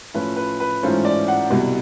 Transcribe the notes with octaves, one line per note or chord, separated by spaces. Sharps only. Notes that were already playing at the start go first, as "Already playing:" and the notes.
A2 F3 A3 C#4 F4 B4
B4
B4
G#2 E3 A3 C#4 F4 C5
D5
F#5
C2 B2 G3